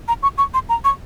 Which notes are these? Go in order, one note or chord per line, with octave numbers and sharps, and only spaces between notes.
A#5
C#6
C#6
C6
A#5
C#6